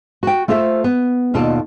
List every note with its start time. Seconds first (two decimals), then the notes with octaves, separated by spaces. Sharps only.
0.23 F#4 G5
0.48 A3 F4 A4 C5 D#5 E5
0.84 B3
1.34 D#2 B2 F4 A4 D5 A5